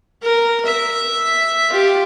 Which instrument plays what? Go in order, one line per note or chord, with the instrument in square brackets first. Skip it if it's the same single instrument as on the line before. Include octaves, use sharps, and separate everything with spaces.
[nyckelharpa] A#4
E5
F4 G4